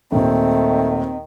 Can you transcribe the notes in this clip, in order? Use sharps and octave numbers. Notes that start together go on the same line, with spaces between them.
D#2 A#2 D#3 A3 C4